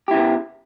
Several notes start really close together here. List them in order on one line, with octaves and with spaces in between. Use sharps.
G4 E4 C#3 B3